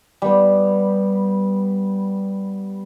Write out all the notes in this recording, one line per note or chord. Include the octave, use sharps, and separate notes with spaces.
G3 B3